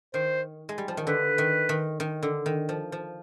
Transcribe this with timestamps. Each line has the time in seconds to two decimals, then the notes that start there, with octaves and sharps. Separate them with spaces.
0.14 D#3 C5
0.69 G#3
0.78 G3
0.88 F3
0.97 D#3
1.07 D3 B4
1.38 D#3
1.69 D#3
2.00 D#3
2.23 D3
2.46 D#3
2.69 F3
2.92 F3